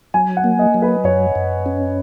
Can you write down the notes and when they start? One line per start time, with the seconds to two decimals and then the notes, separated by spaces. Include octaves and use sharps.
0.14 F#3 G#5
0.37 F#5
0.44 A#3
0.59 D#5
0.74 F#3
0.82 B4
1.04 F#2 C#5
1.35 F#2
1.66 C#4